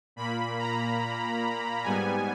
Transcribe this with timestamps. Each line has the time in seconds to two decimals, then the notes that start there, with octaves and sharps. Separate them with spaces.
0.16 A#2 A#3 B5
0.59 A#5
1.84 G#2 G3 B3 G#5